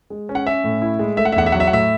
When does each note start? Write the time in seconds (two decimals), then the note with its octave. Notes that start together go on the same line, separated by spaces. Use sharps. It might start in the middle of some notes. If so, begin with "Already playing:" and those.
0.10 G#3
0.29 C#4
0.35 F#5
0.46 C#4 E5
0.64 A2
0.82 E4
0.99 G#3
1.17 A3 E5
1.25 F#5
1.32 E5
1.36 E2 F#5
1.46 E5
1.52 F#3 F#5
1.60 E5
1.67 F#5
1.72 A2 E5